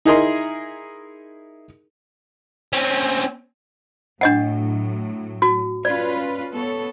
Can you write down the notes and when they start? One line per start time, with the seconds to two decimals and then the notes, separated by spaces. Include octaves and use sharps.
0.05 D#4 E4 G#4 A#4 D#5 C6
2.73 C4 C#4
4.21 A2 F#3 D4 D#5 F#5
5.42 F#4
5.85 C#4 F4 B4 D5
6.52 B3 A4 C#5